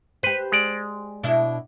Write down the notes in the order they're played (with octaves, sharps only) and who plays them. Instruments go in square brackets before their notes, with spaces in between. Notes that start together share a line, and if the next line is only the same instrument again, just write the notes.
[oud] G4 C5 [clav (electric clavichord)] B4
[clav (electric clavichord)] G#3 D5
[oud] B2 D4 E4